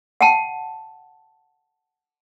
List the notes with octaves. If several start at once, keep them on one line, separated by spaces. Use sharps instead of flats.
F#5 G5 A5